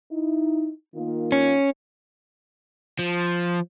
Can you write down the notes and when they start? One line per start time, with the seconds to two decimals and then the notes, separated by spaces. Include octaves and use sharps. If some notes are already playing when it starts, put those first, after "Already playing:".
0.11 D#4 E4
0.95 D#3 A#3 F4
1.32 C#4
2.99 F3